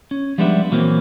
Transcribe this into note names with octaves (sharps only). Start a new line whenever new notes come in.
C#4
F3 G3 G#3 B3 D4 E5
A#2 E3 F#3 A#3 C4